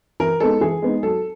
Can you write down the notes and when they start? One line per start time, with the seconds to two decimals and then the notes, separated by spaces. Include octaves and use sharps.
0.20 E3 A#4
0.40 G#3 B3 D#4 A4
0.61 E3 G#4
0.82 G#3 B3 D#4
1.03 F#3 A4